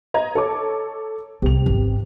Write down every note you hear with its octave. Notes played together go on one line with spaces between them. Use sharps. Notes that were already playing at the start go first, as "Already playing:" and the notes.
D#5 A#5 G#6
A4 C#5 D6
C2 C3 F7
G#1 E2